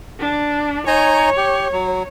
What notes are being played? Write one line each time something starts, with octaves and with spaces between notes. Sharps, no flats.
D4
D#4 C#5 G#5 A#5
G4
F#3